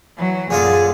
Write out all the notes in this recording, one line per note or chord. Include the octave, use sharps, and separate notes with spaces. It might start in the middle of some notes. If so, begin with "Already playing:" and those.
E3 F#3
F#2 A#2 D3 F4 G#4 A4 G#5